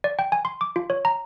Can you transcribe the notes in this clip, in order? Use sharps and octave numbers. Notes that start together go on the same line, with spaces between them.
D5
G5
G#5
C6
D6
F4
C#5
A#5